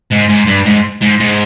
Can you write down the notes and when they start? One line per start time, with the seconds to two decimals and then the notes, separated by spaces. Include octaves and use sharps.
0.11 G#2
0.28 G#2
0.47 G2
0.65 G#2
1.01 G#2
1.20 G#2